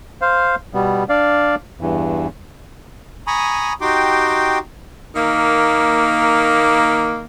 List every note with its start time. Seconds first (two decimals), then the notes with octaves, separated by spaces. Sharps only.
0.22 C5 F5
0.74 B2 G3 B3
1.09 D4 D5 F5
1.81 E2 G2 E3
3.27 G#5 A#5 B5 C#6 D#6
3.81 D#4 F#4 G4 G5 C6 D6
5.16 D#3 A#3